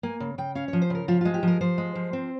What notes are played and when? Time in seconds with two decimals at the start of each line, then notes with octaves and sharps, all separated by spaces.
0.03 A#3 G#5
0.20 C#3
0.38 C#3 G5
0.55 C#4 F5
0.68 C#5
0.73 F3
0.82 C5
0.90 C#3 A#4
1.08 F3 F4
1.21 F4
1.25 G#3
1.34 G4
1.43 F3 A#4
1.61 F3 C5
1.78 G#3
1.95 F3
2.13 C4